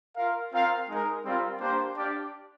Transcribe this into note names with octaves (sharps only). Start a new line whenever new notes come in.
F4 A#4 F5
C4 F4 A#4 F5
G#3 D#4 A#4
G3 C4 F4 A#4
A#3 D4 G4 C5
D4 G4 D5 F5